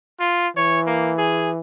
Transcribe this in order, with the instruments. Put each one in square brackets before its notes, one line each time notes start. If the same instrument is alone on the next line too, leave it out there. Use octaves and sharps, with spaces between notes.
[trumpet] F4
[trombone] E3 [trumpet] C#5
[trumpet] A#3
G#4